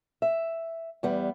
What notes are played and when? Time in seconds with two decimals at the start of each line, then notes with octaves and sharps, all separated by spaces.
0.22 E5
1.03 E2 G3 B3